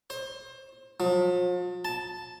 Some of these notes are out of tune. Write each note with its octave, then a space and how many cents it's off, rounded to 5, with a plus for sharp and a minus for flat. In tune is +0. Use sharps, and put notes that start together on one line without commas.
C5 +30
F3 +40
A5 +0